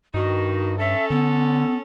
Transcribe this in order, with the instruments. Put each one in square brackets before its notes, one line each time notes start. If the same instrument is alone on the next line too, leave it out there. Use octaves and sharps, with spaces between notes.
[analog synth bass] G2 [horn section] D#3 D#4 [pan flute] F#4
[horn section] C#4 A4 [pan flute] E5
[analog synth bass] D3 [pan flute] B3